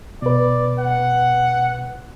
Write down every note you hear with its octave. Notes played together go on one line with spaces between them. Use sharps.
B2 B4 D5
F#5